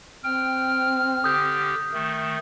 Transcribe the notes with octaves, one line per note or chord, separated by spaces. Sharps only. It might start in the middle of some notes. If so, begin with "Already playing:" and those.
C4 G5 F6
D3 G4 D#6 G6
D#3 A3